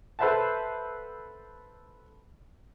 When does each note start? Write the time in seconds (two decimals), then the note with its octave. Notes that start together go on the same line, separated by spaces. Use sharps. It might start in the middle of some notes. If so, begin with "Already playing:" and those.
0.19 A4 B4 C5 E5 F#5 A5